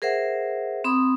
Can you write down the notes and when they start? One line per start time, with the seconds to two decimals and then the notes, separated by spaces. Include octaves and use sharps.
0.02 G#4 A#4 C5 E5 F#5
0.84 C4 B5 D#6